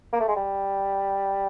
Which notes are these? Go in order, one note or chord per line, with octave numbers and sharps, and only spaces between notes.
A#3
A3
G#3
G3